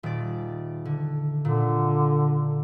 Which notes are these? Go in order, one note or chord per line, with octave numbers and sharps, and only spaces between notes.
D#1 D5
D3
A#2 D3